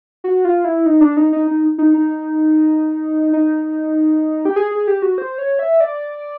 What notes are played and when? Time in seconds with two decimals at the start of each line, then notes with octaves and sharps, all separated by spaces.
0.24 F#4
0.45 F4
0.65 E4
0.86 D#4
1.01 D4
1.17 D#4
1.32 D#4
1.47 D#4
1.78 D#4
1.94 D#4
3.33 D#4
4.45 G4
4.56 G#4
4.71 G#4
4.87 G4
5.02 F#4
5.18 C5
5.38 C#5
5.59 E5
5.80 D5